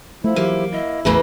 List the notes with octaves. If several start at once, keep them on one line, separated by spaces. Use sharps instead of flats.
F3 A3 E4
E3 F#3 A#3 G4
E4 D#5
A1 E2 C#3 E3 A3 A#3